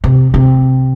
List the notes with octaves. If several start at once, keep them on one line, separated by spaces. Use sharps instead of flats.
C3
C3